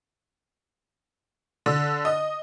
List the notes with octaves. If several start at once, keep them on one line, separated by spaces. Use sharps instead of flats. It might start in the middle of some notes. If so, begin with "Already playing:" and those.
D3
D#5